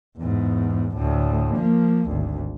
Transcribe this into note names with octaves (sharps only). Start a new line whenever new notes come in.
E2 G#2
D2 A2
F3 A#3
G#1 D2